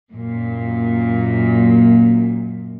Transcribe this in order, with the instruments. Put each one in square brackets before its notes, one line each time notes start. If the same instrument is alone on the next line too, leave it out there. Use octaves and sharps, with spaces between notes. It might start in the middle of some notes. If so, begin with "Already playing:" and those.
[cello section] F#2 A#2